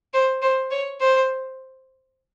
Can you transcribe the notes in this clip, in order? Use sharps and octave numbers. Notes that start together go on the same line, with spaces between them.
C5
C5
C#5
C5